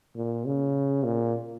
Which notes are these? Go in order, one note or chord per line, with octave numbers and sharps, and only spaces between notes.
A#2
C#3
A#2